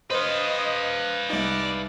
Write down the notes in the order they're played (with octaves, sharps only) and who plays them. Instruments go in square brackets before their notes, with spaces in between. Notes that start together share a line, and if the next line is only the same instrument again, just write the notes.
[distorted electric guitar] B4 F5 [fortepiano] C5 [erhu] D#5
[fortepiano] C2 D#4 [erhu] D5